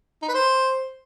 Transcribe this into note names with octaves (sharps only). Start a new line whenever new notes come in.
D#4
B4
C5